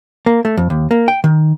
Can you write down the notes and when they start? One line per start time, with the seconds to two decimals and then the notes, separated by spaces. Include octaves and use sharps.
0.26 A#3
0.45 A3
0.57 F2
0.70 D#2
0.91 A#3
1.08 G5
1.24 D#3